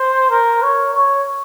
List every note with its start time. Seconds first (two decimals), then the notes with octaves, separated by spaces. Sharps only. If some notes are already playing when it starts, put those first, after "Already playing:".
Already playing: C5
0.30 A#4
0.62 C#5
0.95 C#5